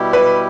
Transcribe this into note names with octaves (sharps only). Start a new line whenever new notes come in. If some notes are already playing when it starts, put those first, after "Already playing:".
Already playing: B2 G3 E4 G4
B4